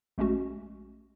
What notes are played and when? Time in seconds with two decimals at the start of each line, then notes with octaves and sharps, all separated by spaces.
0.18 A#1 G#3 A3 C#4 F#4